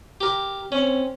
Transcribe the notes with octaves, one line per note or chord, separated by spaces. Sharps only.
G4 A#4
C4 C#4